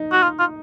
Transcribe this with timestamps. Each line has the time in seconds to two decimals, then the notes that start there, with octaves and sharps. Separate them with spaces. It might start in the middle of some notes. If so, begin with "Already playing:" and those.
Already playing: D#4
0.12 F#4
0.23 F4
0.39 F4